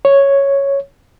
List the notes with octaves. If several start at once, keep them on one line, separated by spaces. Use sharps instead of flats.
C#5